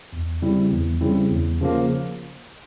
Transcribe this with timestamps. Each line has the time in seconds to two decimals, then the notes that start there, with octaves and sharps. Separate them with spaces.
0.13 E2
0.42 C#3 G3 C4 E4
0.72 E2
1.01 C#3 G3 C4 E4
1.32 E2
1.61 C#3 F3 A#3